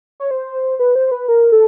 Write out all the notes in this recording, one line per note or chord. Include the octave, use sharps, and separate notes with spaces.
C#5
C5
B4
C5
B4
A#4
A4